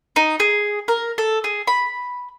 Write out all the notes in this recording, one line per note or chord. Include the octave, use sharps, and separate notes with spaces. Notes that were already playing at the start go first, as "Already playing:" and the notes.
D#4
G#4
A#4
A4
G#4
B5